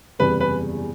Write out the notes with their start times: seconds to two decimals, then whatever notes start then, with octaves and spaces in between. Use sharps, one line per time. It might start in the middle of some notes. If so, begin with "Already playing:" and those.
0.19 F#1 E2 C3 G3 B3 B4
0.40 B4